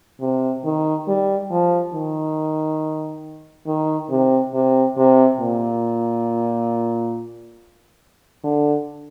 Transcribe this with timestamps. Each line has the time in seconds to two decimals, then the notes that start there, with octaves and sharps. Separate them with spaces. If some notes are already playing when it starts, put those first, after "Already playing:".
0.21 C3
0.65 D#3
1.08 G3
1.51 F3
1.94 D#3
3.67 D#3
4.10 C3
4.54 C3
4.97 C3
5.40 A#2
8.44 D3